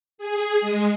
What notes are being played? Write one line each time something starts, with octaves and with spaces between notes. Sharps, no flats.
G#4
G#3